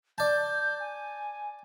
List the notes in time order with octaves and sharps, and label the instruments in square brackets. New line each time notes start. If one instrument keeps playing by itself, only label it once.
[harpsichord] D5 A5 [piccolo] G6
[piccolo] G#5